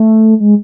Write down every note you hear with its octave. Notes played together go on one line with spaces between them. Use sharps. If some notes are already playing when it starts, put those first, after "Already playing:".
Already playing: A3
G#3